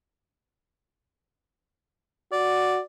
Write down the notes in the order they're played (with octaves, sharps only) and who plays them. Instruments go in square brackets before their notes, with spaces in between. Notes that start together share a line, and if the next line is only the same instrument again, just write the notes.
[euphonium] F#4 [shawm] D5